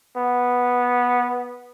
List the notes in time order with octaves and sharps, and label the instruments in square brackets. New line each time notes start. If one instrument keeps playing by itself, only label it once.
[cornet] B3